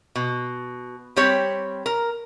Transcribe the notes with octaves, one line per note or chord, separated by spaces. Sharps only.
B2
G3 C4 G4 C#5
A#4